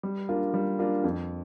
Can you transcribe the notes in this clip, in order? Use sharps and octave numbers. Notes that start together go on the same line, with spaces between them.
G3
A#3 D4 F4
G3
A#3 D4 F4
F2